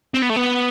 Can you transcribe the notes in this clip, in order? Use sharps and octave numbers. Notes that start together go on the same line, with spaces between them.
C4
B3
A3
B3